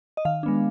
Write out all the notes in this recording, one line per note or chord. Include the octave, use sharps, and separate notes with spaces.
D#5
D#3 F5
G#3 B3 D4